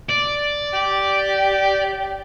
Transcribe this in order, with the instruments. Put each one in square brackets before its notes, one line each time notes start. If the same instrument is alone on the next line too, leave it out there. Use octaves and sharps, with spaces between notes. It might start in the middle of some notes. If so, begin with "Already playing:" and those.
[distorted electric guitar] D5
[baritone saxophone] G4